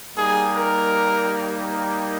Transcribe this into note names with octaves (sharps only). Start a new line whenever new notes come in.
G3 A#3 D#4 G#4
A#4
A#4